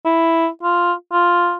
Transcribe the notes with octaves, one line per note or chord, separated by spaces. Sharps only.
E4
F4
F4